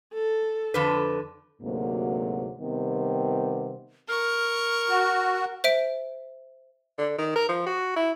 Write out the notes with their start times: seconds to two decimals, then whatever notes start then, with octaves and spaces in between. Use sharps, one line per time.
0.13 A4
0.74 F2 D3 B4
1.62 D2 G#2 C3 F#3 A#3
2.60 C3 D#3 G3 B3
4.09 A#4 C#6 F6
4.89 F#4
5.64 C5 E5 D7
6.98 D3
7.18 D#3
7.36 A#4
7.49 F3
7.66 F#4
7.96 E4